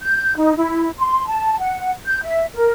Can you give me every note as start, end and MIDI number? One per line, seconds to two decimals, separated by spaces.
0.01 0.36 91
0.36 0.53 63
0.57 0.89 64
0.98 1.24 84
1.26 1.56 81
1.59 1.92 78
2.06 2.19 91
2.23 2.44 76
2.54 2.72 70